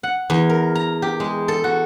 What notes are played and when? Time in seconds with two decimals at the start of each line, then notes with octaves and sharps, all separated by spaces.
0.03 F#5
0.30 E2
0.50 A#4
0.75 A#5
1.02 G4
1.20 G#3
1.48 A4
1.64 F#4